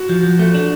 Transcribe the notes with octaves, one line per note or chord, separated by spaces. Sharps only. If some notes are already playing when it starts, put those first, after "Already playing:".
Already playing: F#4
F3
F3
A3
D4